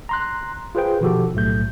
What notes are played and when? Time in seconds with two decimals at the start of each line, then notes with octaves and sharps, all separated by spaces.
0.09 A#5 C6 F#6
0.75 F4 G#4 B4 C5 G5
1.01 B2 D#3 F3 F#4 G4 A4
1.34 B1 A2 A3 G6